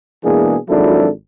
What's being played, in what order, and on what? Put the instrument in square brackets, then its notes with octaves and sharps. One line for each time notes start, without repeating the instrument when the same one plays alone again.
[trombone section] B2 E3 G#3 A#3 D4 G#4
G#1 F3 F#3 D4 E4 A4